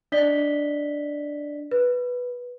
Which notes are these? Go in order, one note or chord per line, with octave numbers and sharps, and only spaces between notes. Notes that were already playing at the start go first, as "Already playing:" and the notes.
D4 D5 D#5 B6 G7
B4